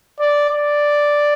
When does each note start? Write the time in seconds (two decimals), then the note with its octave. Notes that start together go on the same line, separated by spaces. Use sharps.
0.19 D5
0.49 D5